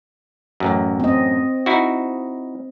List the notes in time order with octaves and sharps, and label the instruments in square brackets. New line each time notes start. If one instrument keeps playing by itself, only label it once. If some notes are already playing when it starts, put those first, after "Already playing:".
[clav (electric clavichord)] A1 F#2
[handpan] C4 D#5
[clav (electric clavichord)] D#4 E4 F#4